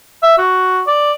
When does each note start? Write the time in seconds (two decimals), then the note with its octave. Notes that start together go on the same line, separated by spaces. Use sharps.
0.23 E5
0.38 F#4
0.87 D5